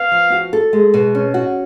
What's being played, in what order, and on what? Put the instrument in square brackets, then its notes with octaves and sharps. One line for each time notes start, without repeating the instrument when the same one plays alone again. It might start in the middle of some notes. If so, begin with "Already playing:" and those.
Already playing: [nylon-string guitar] B3 [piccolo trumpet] F5
[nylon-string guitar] F3
F#4
A4
G#3
B2
C#4
F#4